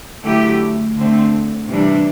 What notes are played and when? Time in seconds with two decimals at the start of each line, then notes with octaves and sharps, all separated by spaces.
0.24 D3 F#3 A3 E4 G4
0.96 D3 A3 C4
1.68 C3 E3 G3 D4